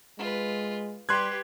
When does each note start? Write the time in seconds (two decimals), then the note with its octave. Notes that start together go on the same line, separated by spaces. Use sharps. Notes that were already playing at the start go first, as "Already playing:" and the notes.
0.19 G#3 F4 B4
1.09 G3 G4 B4 C6 F#6 G#6